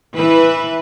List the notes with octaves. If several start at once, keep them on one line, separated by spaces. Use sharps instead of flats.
E3 B4 E5